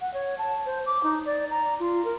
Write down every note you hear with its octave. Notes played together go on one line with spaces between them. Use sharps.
F#5
C#5
A5
C5
D6
D#4
D5
A#5
F4
A#4